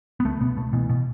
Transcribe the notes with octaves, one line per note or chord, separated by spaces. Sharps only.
B3
C#2 A3
B2 B3
B2 A3
B2 E3
B2